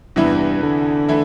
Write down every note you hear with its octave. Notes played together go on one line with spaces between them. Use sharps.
E2 G2 C3 E3 B3 E4
D3
E3 A3 E4